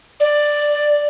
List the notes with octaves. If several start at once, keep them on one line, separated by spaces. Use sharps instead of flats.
D5